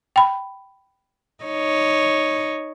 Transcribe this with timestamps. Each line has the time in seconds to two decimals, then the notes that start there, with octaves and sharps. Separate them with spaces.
0.16 G5 B5
1.44 D#4 C#5